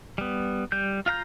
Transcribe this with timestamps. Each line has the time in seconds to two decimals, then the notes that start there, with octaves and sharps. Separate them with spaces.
0.18 G3 B3
0.72 G3 G6
1.06 F4 F5 A#5 G6